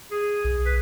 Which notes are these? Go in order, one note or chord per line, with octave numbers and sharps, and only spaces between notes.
G#4
B1
B4